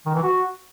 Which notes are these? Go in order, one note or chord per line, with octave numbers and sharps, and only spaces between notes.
D#3
E3
F#4